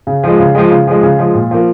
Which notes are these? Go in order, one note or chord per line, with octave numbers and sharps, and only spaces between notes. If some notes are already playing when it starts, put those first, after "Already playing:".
C#3
F3 G#3
C#3
F3 G#3
C#3
F3 G#3
C#3
F3 G#3
A#2
F3 A#3